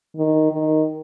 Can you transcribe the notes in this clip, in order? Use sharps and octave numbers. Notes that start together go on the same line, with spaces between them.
D#3
D#3